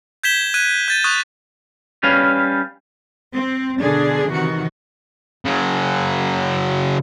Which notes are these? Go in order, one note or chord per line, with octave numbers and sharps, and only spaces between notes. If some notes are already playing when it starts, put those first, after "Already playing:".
G6 G#6 B6 E7 G7
F#6 G#6 D#7
G6 A6 D#7
C#6 D#6 F#6
G3 C#4 B4 F5
C4
B2 D3 D4 G#4
C3 D#3 E3 F#4
C#3 F#3